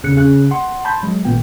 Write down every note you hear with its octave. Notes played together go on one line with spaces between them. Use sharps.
E2 C#3 F#6 C#7
C#3 F#6
F#5 C6
A5 B5 C6 G6
F#3 G#3
G#1 A#2 B3 G5